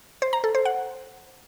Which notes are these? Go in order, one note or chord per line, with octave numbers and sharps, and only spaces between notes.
C5
A#5
A4
C5
F#5